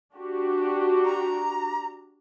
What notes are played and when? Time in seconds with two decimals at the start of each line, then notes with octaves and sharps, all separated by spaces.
0.14 D4 F#4 G4
1.05 A#5